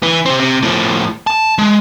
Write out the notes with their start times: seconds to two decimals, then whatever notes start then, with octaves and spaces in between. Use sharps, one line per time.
0.03 E3
0.26 C3 C4
0.40 C3
0.63 A2 F3
1.27 A5
1.58 G#3